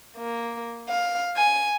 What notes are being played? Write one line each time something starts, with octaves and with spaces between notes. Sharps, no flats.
A#3
F5
G#5